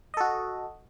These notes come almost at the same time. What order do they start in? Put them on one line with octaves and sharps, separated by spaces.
D#5 A4 F#4